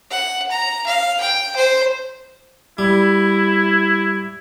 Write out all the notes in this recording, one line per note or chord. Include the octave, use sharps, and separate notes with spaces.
F#5
A#5
F5
G5
C5
G3 E4